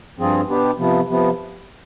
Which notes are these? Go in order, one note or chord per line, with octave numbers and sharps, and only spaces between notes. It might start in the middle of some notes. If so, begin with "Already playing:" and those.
G2 F3 C4 F4 G#4
B2 B3 D4 G4
C3 F3 B3
C3 F3 B3